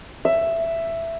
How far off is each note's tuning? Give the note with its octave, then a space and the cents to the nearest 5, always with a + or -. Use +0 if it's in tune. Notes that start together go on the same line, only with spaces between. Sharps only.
E5 +10